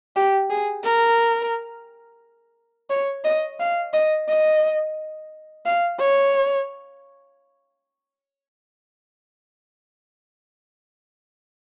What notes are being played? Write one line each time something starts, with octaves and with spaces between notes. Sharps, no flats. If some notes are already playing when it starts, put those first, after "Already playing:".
G4
G#4
A#4
C#5
D#5
F5
D#5
D#5
F5
C#5